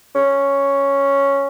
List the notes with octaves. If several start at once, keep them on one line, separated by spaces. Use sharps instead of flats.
C#4